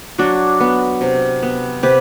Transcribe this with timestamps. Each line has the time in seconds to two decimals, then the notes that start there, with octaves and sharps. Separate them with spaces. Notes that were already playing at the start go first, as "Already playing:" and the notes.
0.18 F#3 D4 F#4
0.60 B3
1.01 C3
1.43 B3
1.83 C3 G4 B4